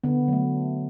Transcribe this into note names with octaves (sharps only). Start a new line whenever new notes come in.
D3 B3
F#3 A3